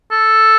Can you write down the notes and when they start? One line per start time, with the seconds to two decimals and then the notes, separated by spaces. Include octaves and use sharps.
0.12 A4